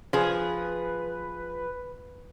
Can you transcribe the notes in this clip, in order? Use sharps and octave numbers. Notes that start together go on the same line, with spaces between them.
F3 G#4 B4